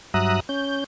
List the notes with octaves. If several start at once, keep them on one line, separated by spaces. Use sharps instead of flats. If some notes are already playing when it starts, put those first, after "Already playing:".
G2 F#3 E5 A#5 D#6 F#6
C#4 G6